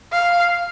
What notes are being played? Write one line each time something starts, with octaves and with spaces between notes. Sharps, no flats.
F5